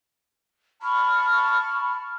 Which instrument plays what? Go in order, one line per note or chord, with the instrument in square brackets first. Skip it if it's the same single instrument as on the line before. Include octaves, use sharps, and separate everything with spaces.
[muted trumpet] A5 [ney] B5 [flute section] C#6 F6